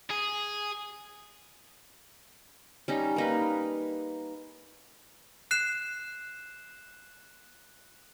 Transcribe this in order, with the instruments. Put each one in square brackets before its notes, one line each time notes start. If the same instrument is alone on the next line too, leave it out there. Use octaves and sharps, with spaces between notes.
[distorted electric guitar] G#4
[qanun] G3 C#4 D#4
A#3 D#4 B4
[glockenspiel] F#6 C7 E7